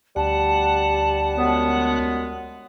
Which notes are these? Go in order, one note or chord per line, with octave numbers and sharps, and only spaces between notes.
D2 G3 F#5 A5
F#2 G#3 B3